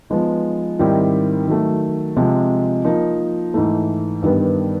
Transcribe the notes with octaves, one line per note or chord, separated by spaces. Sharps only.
F3 G#3 B3 D#4
G#2 D#3 G3 C4 E4
D#3 F#3 A3
C3 F3 G#3
F3 A#3 D#4
G#2 E3 A3
G2 D#3 G3 B3